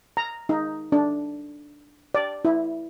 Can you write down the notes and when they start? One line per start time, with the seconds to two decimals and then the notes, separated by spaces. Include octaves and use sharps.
0.17 A#5
0.49 D#4
0.92 D4
2.15 D5
2.45 E4